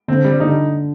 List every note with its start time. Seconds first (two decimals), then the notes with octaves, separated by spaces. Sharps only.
0.08 D3 C4
0.25 G3
0.40 D3 D#4